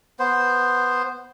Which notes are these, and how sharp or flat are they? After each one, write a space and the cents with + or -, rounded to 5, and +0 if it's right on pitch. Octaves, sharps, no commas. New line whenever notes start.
B3 +0 C5 +0